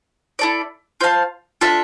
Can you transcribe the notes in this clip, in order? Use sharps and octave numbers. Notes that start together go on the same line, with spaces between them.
E4 A4 D5
F4 C5 F5 A5
D4 F4 A4 E5